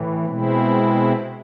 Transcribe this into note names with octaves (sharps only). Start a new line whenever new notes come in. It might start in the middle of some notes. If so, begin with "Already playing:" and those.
Already playing: A2 E3
B2 G#3 C4 E4